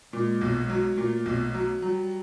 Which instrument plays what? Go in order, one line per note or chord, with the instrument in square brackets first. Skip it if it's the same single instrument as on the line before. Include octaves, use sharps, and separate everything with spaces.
[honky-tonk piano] A#2 [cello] G#3
[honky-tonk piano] B1
[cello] G#3
[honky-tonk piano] F#3
[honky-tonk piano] A#2 [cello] A3
[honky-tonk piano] B1
F#3
[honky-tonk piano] F#3 [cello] G3